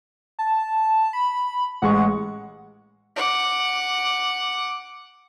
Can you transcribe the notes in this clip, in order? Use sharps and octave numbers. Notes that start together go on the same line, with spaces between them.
A5
B5
A1 G#3 F#5 C#6
F#5 D6